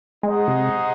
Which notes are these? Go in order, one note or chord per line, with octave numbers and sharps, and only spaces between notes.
G#3 D#4 G#4 C5 D#5 F#5
C3